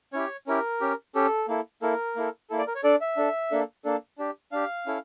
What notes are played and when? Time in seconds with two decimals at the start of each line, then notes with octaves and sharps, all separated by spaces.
0.13 C#4 E4 G4 C#5
0.47 C#4 E4 G4 A#4
0.81 C#4 G4
1.15 C#4 G4 A4
1.48 A#3 E4 A4
1.82 A#3 E4 A4 A#4
2.16 A#3 E4 A4
2.50 A#3 E4 A4
2.58 D5
2.67 A#4
2.75 C#5
2.84 D4 A4 D5
3.01 E5
3.17 D4 A4
3.51 A#3 D4 A4
3.84 A#3 D4 A4
4.18 D4 G4
4.52 D4 G4 F5
4.86 C#4 E4 A4